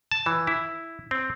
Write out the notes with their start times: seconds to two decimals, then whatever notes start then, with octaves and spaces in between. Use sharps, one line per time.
0.11 A5
0.26 E3
0.47 E4
1.11 C4